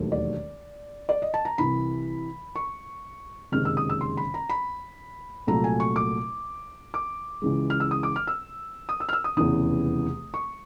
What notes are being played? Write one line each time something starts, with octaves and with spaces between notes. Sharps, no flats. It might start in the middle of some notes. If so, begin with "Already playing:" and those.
Already playing: E1 D#2 D#3 F#3 A3
D5
D5
D#5
A5
A#5
C2 C3 E3 B5
C#6
F#1 F2 C3 D#3 G#3 F6
E6
D#6
E6
C6
B5
A#5
B5
C2 A#2 F#3 A3 A#5
G#5
C#6
D6
D6
C#2 C#3 E3 G#3
F6
E6
D#6
D6
F6
E6
D#6
E6
F6
E6
D#6
F1 E2 C#3 E3 D#6
C#6